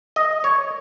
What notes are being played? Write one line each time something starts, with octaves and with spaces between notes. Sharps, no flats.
D#5
C#5